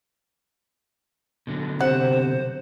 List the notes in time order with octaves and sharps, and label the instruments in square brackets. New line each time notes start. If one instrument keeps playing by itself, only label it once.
[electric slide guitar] B2 D3 F#3
[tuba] C3 [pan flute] C5 [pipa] F#5